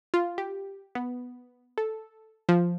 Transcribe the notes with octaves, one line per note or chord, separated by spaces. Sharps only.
F4
G4
B3
A4
F3